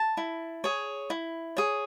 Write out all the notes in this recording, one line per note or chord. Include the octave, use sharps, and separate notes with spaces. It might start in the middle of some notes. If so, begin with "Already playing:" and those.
Already playing: A5
E4
G#4 C#5
E4
G#4 C#5